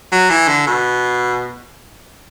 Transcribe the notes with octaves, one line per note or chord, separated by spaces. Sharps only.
F#3
E3
D3
B2